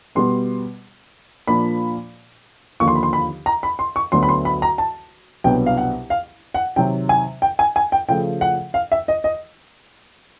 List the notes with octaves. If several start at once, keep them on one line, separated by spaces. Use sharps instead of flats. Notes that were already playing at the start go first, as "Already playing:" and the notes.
B2 G3 B3 C6
A#2 F3 A#3 D4 B5
D#2 D3 F3 A#3 C#6
C6
B5
C6
B5
A#5
B5
C6
C#6
D2 D3 F#3 B3 C6
B5
C6
B5
A#5
A5
C2 B2 F#3 B3 D4 G5
F5
F#5
F5
F#5
C3 D#3 F#3 G5
G#5
G5
G#5
G#5
G5
C#3 F3 A3 G5
F#5
F5
E5
D#5
D#5